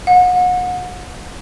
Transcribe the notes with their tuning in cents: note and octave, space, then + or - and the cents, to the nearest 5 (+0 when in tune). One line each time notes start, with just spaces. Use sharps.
F#5 -35